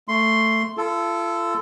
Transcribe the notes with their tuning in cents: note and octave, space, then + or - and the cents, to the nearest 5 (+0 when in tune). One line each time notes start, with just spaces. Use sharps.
A3 +10 C6 +0
F4 -35 A4 +0